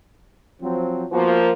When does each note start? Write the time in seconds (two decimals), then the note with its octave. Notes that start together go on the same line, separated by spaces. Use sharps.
0.61 F3 F#3 C4
1.12 F3 A#3 B3 F#4